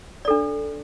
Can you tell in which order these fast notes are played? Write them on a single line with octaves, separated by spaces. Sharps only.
D5 A4 D4